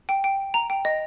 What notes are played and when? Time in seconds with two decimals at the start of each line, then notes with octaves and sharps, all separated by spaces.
0.09 G5
0.24 G5
0.54 A#5
0.70 G5
0.85 D#5